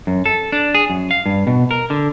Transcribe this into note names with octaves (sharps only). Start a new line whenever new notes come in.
F#2
A4
D4
G#4
F#2
F5
G2
B2
A#4
D3